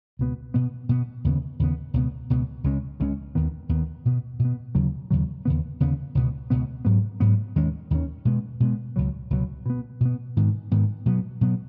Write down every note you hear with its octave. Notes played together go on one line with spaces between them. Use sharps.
C#2 B2 B3
B2 B3
B2 B3
D#2 C#3 B3
D#2 C#3 B3
C#2 B2 B3
C#2 B2 B3
C#2 C#3 G#3 C#4
C#2 C#3 G#3 C#4
D#2 D#3 B3
D#2 D#3 B3
B2 B3
B2
B3
D#2 C#3 F#3
D#2 C#3 F#3
D#2 C#3 B3
D#2 C#3 B3
C#2 B2 B3
C#2 B2 B3
G#2 F#3 B3
G#2 F#3 B3
D#2 D#3 G#3 C#4
D#2 D#3 G#3 C#4
B2 G#3 B3
B2 G#3 B3
C#2 B2 F#3
C#2 B2 F#3
B2 B3
B2
B3
G#2 D#3 B3
G#2 D#3 B3
B2 F#3 B3
B2 F#3 B3